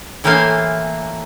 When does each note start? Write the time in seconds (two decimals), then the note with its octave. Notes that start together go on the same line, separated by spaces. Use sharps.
0.24 A2 E3 A#3 C5 F5 G#5